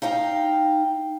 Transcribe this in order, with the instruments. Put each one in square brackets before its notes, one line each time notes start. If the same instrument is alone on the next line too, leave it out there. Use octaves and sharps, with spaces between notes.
[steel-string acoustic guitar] D#4 F5 G5 A#5